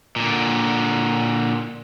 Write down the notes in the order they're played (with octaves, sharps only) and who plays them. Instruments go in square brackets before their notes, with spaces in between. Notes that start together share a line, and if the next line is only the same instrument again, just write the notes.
[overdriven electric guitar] A#2 D3